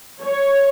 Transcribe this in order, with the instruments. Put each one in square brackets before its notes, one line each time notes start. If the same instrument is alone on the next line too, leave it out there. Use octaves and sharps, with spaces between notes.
[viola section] C#5